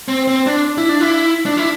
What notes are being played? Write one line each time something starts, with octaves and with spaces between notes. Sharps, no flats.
C4
C4
D4
E4
D4
E4
D4
E4